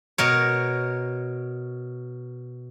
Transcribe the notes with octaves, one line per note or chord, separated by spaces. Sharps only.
B2 A#4 C#5